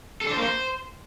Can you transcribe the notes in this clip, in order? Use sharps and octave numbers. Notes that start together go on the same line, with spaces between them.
A4
D4
C5
A#3
C5